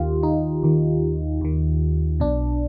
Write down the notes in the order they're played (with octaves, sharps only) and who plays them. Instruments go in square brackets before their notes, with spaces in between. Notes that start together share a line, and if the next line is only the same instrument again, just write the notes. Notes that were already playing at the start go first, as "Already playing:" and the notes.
Already playing: [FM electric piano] D#2 D#3 F4 G4
D#4
D#2 D#3
D#2 D#3
B1 B2 D4